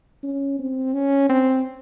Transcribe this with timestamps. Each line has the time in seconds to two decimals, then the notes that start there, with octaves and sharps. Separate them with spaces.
0.23 C#4
0.59 C4
0.94 C#4
1.29 C4